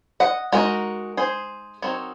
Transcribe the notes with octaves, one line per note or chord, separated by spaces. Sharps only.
D#5 F#5
G#3 C4 D#4 F#4 A#4
G#4 C5
F#3 C4 D#4 A#4 C#5